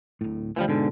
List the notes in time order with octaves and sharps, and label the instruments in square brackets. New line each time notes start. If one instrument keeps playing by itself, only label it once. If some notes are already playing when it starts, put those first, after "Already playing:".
[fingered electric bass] D1 A2
[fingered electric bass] D2 [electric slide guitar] E3 F3 G3
[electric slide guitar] G#2 D3 [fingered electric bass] B2